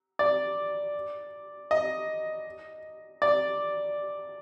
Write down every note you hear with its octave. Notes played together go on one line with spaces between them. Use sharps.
D5
D#5
D5